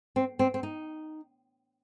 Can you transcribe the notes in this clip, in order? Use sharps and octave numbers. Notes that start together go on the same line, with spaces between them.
C4
C4
C4
D#4